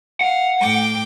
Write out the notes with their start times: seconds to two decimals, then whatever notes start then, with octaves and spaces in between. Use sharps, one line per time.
0.21 F5 F#5
0.61 A2 G5 D6